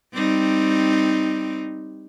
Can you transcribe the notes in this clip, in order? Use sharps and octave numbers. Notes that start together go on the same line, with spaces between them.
G3 C4 D#4